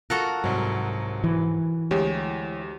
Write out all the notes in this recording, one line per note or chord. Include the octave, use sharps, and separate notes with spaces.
F4 F#4 A4 A#4 F#6
C2 G#2 F#3
E3
D2 G#3 E4 G4 C#5